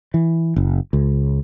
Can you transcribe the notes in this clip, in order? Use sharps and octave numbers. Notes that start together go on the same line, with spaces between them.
E3
F#1
C#2